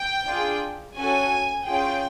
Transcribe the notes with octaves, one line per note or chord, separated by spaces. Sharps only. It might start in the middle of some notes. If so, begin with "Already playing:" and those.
Already playing: G5
D4 F4 G#4
C#4 F#4 A4 G#5
C#4 F4 G#4 G5